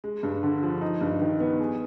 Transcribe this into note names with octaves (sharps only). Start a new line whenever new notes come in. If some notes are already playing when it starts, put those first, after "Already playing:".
G#3
G2
D3
F3
D#4
G2
D#3
B3
G#4